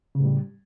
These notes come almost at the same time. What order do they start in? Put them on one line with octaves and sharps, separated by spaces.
C#3 A2 G3